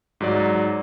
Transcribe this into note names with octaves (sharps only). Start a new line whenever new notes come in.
G#2 F#3 D5